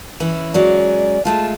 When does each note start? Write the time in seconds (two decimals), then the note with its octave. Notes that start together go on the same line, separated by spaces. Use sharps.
0.20 E3 C#4 E4
0.54 F#3 G#3 C#4 D5
1.25 G#3 A3 F4 A5